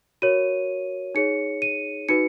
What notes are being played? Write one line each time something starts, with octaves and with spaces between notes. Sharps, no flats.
F#4 A#4 C#5 D#7
D#4 G#4 C#5 C#7
D#7
D#4 F#4 B4 C#7